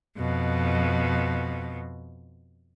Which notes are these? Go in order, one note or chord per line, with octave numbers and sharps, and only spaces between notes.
F2 B2